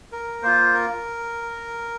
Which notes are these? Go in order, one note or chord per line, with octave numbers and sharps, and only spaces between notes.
A#4
A#3 F4 C5
A#4